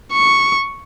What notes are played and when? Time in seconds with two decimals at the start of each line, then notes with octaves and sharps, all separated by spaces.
0.13 C#6